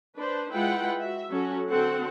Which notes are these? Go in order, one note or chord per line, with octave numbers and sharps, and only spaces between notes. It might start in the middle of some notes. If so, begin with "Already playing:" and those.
D4 B4 C5
G#3 E4 F4 B4 F#5 G5
F#4 E5
F#3 C#4 F#4 A4
D3 C4 F#4 A4 F#5